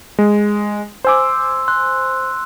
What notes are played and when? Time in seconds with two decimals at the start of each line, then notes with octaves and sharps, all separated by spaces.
0.19 G#3
1.05 C5 G#5 C6 D6 E6
1.68 C6 F#6